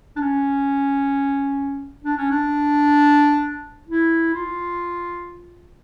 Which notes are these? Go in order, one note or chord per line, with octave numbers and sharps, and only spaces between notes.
D4
C#4
D4
C#4
D4
E4
F4